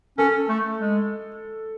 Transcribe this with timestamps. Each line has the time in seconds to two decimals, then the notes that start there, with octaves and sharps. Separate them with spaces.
0.18 C#4 A4
0.49 A3
0.79 G#3